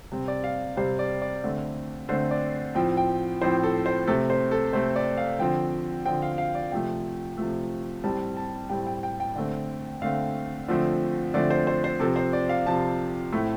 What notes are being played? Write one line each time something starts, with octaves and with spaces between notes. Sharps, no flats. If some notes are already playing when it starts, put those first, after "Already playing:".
C3 G3 C4
D5
F5
C3 G3 C4 C5
D5
D5
D3 A3 C4
D3 A3 C4 C5
D5
A2 F3 C4 G5
G5
A2 F3 C4 C5
A4
C5
C3 A3 C4 A4
C5
A4
C3 A3 C4 C5
D5
F5
D3 F3 C4 G5
D3 F3 C4 G5
F5
F5
D5
C3 F3 A3 G5
C3 F3 A3
A2 G3 C4 A5
A5
A2 G3 C4 G5
G5
G5
G5
D3 A3 C4
D3 A3 C4 F5
D3 F3 A3 C4
D3 F3 A3 C4 D5
C5
C5
C5
C3 F3 C4 A4
C5
D5
F5
C3 F3 C4 A5
A2 A3 C4